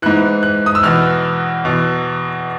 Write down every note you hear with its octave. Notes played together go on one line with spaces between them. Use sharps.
G#2 E3 F#6
F#6
D#6
E6
E2 B2 F6
E2 B2